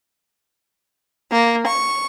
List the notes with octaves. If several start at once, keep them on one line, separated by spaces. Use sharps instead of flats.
A#3
C#6